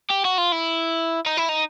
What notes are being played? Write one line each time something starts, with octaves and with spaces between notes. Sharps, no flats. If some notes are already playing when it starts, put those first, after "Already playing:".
G4
F#4
F4
E4
D#4
E4
D#4